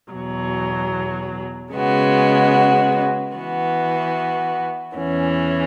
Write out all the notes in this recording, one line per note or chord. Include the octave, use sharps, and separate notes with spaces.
E2 B2 F#3
C#3 G#3 B3 F#4
E3 B3 F#4
E2 E3 C#4